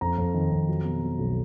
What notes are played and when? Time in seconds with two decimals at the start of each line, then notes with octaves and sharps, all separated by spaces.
0.01 F2 A#5
0.18 F2
0.34 D#3
0.52 F2
0.68 F#3
0.85 B2
1.03 F#3
1.19 B1